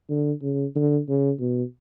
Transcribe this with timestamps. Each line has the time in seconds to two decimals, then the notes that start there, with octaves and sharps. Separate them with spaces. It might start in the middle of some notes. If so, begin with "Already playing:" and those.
0.09 D3
0.42 C#3
0.76 D3
1.08 C#3
1.40 B2